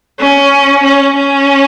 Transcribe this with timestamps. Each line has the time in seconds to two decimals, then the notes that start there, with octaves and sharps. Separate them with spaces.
0.19 C#4
0.84 C#4
1.16 C#4